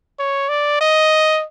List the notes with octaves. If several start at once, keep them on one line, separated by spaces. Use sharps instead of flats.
C#5
D5
D#5